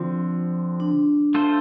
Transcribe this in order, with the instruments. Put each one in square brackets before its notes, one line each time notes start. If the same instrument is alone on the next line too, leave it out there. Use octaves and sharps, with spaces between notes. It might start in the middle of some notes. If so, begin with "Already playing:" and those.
Already playing: [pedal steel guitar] D3 F3 C4 [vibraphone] F4
[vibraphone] D4
[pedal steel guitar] A3 F4 A4 C5